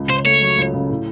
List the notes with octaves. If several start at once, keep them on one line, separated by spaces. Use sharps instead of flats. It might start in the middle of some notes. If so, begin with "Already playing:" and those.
Already playing: C#2
C#3 C5
A3 C#5
F#3
C#2
C#3
A2